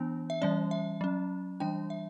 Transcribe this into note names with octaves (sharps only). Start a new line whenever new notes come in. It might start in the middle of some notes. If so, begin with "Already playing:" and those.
Already playing: E3 B3 D4
E5
E3 G3 C#4 D5
E5
F#3 C#4
E3 G3 D4 G5
E5